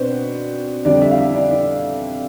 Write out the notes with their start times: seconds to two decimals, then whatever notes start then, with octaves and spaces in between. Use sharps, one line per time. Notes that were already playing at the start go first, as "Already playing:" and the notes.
Already playing: B2 B3 C4 D4 B4 C5
0.85 F2 D3 G3 D4 D5
1.02 E4 E5
1.11 F5
1.18 E4 E5
1.34 D4 D5
1.51 D4 D5